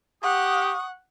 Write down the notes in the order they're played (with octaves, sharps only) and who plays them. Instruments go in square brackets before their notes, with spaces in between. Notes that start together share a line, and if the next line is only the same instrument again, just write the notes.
[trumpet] G4 [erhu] F#5 [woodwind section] C#6 D#6